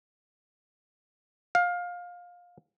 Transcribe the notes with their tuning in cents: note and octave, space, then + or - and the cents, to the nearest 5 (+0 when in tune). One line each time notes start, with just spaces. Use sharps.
F5 +20